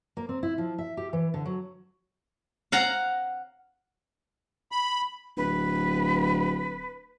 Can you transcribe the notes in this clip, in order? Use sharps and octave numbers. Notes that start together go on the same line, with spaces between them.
A#3
C4
E4
F3
E5
G4
E3
D3
F#3
F5 F#5 A#5
B5
D1 B4